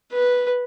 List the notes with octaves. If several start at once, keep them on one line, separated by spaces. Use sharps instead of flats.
B4